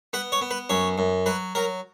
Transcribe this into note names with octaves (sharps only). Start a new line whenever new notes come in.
B3 B4
C#5
B3
B4
F#2 C#5
F#2
F#3 B4
F#3 A#4